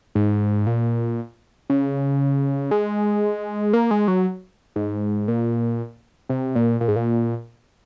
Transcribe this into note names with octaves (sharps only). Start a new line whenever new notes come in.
G#2
A#2
C#3
G#3
A#3
G#3
F#3
G#2
A#2
C3
A#2
A#2
G#2
A#2